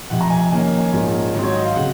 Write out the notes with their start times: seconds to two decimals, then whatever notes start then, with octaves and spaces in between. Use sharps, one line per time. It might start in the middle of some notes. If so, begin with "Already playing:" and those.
0.10 F1 F2 C3 F#5
0.21 A#5
0.30 G#5
0.51 F2 D#3 A#3 C#4 G#5
0.78 G#5
0.93 A#1 G#2 F3 A#3 C#4
1.34 G#1 G#2 F#3 C4
1.43 C#5
1.54 D#5
1.65 F5
1.76 C#3 F#3 F#5